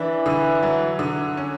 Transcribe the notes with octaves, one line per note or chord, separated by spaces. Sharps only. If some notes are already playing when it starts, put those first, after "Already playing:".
Already playing: D3 E3 D4
D3
F#3
D3
C#4